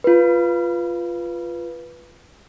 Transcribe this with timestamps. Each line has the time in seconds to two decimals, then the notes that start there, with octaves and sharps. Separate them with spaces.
0.04 F4 B4